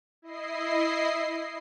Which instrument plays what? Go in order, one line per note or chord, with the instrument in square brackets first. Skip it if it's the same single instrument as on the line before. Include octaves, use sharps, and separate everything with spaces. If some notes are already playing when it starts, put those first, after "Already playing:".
[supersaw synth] E4 D#5 C7